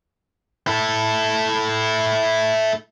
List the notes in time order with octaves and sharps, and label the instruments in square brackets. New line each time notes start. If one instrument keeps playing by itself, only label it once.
[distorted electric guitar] E4 A4